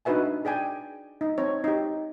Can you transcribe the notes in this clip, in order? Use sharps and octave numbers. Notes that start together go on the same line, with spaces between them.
D4 D#4 F#4 B4 E5 G#5
G#4 D5 G5 G#5
D#4
C4 C#5
D#4 G4